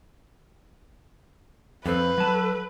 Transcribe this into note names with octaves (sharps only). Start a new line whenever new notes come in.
F2 C4 A4 B4
F#3 A5